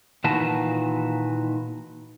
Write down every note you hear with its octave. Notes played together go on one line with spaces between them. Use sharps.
A#2 D#3 E3 F#4 B4 A5